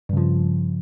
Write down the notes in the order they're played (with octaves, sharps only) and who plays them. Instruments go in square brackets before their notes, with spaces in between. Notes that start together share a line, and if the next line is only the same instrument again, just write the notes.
[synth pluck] G2
C#3
F3